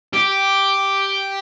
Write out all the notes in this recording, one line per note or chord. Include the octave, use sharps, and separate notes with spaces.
G4